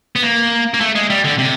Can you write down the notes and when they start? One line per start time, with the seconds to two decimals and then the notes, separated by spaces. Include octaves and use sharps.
0.16 B3
0.23 A#3
0.74 A#3
0.81 A3
0.95 G#3
1.10 G3
1.24 D3
1.38 C3